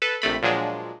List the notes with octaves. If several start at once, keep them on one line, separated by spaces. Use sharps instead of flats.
A4 B4
A#1 C3 A3 B5
A#2 F3 F#3 G#3 D4